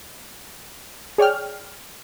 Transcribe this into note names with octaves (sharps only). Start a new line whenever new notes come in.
G#4 C#5 D5 G5 F6